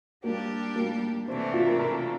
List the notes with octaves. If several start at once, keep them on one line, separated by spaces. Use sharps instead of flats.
G3 A#3 D4 G4
A#3
C3 E3 A3 C4 D4
F4
A#4
A#4